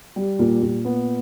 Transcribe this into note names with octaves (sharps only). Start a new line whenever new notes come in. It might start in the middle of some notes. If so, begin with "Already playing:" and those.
G3
A#2
A#2
B3